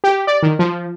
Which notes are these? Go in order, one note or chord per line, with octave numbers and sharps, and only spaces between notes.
G4
D5
D#3
F3